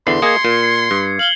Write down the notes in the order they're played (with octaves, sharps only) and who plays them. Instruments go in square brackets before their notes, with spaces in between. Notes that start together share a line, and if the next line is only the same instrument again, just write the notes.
[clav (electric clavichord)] E2 D3 E3 [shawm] C6 [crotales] C7
[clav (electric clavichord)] A#3 G#4 D#5 [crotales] G#6 C#7
[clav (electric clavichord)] A#2
G2
[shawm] F5 [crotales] F#7 G7